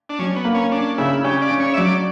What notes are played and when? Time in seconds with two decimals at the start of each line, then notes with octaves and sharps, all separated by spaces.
0.09 D4
0.19 F#3 C#4
0.36 B3
0.45 A#3
0.54 C#4
0.72 C#4 D4
0.98 C#3 E4
1.24 C#4 G4
1.42 D5
1.50 C#4
1.60 C#5
1.74 E5
1.77 F#3 D5